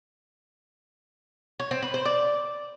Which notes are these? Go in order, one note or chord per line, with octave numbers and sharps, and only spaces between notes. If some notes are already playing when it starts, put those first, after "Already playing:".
C#5
C4
B4
C5
D5